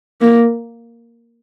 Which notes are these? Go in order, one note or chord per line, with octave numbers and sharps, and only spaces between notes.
A#3